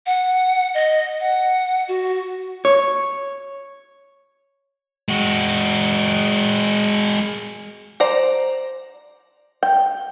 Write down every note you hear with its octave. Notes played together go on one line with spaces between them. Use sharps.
F#5
D#5
F#5
F#4
C#5
G#3 F#4
C5 D5 A#5
G5